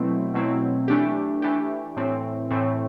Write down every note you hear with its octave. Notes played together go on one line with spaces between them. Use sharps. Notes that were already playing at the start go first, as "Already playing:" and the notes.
Already playing: B2 F#3 A3 C4 E4
B2 F#3 A3 C4 E4
E3 A3 D4 G4
E3 A3 D4 G4
A2 E3 A3 C4
A2 E3 A3 C4